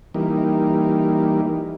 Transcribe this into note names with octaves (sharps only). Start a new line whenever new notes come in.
E3 G3 A#3 D#4